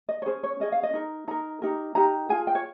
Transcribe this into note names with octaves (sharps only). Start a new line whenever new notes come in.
D#5
C#5
C#4 G#4 C5
C#5
C#4 G#4 D#5
F5
D#5
D#4 A#4
D#4 A#4 A#5
D#4 G4 A#4
D#4 G4 A#4 A#5
F4 G#4 G#5
G5
C#5